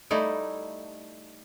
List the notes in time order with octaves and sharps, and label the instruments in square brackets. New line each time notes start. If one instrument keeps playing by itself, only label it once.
[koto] G3 A3 D#4 E4